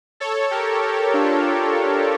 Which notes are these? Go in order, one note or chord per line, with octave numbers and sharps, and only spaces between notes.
A4 C#5
G4 A#4
G4 A#4
D4 F4